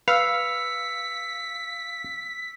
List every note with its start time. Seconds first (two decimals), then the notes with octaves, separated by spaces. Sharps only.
0.08 B4 F5 E6 B6 C#7